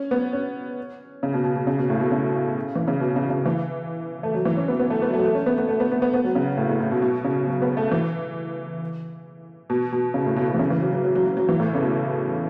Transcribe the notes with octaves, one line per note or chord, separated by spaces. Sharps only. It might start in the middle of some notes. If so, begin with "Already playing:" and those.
Already playing: C#4
B3
C#4
C#3
B2
B2
B2
C#3
B2
A2
B2
C#3
E3
C#3
B2
C#3
C#3
E3
A3
F#3
E3
C#4
B3
B3
A3
B3
F#3
A3
F#3
A3
C#4
B3
B3
A3
B3
B3
B3
B3
F#3
C#3
A2
A2
A2
B2
B2
C#3
F#3
B3
A3
E3
B2
B2
C#3
A2
B2
B2
E3
C#3
E3
F#3
F#3
F#3
F#3
F#3
F#3
E3
A2
C#3
B2